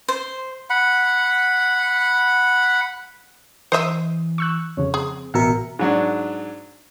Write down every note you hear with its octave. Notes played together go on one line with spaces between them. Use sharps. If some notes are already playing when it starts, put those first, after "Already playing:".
C5
F#5 B5
E3 C5 D#5 E5 C7 D#7
C#6 E6 F#6
F2 C#3 C#5
C4 G#4
A1 B2 A#4 E5 C#7
G#2 F#3 D4